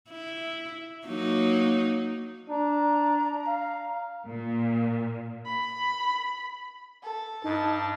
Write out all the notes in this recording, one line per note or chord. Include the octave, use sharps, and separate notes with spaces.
E4
F#3 A#3 D#4
D4 A#5
F5
A#2
B5
A4
G2 D#4 A5